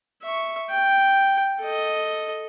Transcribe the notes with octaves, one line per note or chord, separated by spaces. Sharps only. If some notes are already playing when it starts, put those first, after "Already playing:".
E5 C#6
G5
A4 D#5